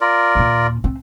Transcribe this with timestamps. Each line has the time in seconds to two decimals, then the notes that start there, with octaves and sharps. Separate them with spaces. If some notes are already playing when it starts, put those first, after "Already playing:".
0.01 F4 A#4 D5
0.35 D#2 A#2
0.84 C4